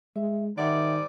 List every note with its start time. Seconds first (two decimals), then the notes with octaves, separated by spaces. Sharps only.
0.16 G#3 E5
0.57 G#2 D#3 G3 D5 E5 F#5 G5